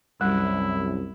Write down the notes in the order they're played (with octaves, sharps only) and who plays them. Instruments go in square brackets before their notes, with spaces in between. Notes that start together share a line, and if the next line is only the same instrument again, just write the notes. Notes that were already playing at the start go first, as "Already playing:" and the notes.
[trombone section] C2 F#2 [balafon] G3 [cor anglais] E4